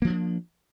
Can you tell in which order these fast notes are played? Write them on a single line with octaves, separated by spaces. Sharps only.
A#3 E3 D4 F3